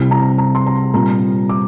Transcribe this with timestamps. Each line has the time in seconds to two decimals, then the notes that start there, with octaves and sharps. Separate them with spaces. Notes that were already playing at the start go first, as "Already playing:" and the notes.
Already playing: C3 G3 C4 E4
0.11 A#5
0.38 A#5
0.55 C6
0.66 A#5
0.93 A#2 G3 C4 A#5
1.49 D6